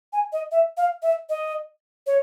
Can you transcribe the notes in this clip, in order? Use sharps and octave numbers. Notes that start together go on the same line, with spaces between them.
G#5
D#5
E5
F5
E5
D#5
C#5